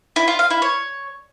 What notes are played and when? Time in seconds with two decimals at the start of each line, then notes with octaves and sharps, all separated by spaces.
0.16 E4
0.28 F4
0.39 F5
0.50 E4
0.62 C#5